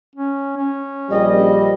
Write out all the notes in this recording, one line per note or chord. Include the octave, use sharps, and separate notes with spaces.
C#4
C#4
A#1 G3 D#5